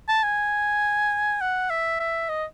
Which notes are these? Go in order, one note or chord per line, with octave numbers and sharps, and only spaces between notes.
A5
G#5
F#5
E5
E5
D#5